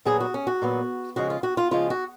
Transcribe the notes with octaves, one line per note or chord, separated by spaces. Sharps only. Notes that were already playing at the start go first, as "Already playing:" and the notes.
A#2 F#3 B3 G#4
F#4
C#4
F#4
A#2 F#3 B3
C#3 F3 G#3 F#4
F4
F#4
F4
C#3 F3 G#3 F4
F#4